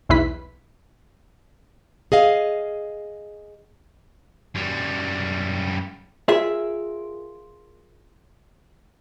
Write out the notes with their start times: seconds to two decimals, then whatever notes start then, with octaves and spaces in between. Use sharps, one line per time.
0.09 B1 E2 E4 B4 B6
2.12 G#4 D#5 F5
4.55 F#2 G3
6.28 F4 G#4 A#4 E5